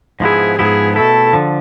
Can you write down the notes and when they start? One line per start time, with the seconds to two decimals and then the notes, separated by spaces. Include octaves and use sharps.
0.20 G#2 F3 B3 E4 G#4
0.59 G#2 F3 B3 E4 G#4
0.96 B2 A3 E4 A4
1.33 D3 F3